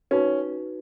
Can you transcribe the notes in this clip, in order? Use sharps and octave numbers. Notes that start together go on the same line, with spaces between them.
C#4 D#4 F#4 B4